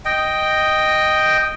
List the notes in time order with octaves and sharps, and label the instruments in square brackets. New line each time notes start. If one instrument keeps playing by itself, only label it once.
[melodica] D#5 G5